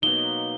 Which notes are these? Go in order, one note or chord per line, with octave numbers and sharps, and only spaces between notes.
B2 F#3 A#3 D#4 G7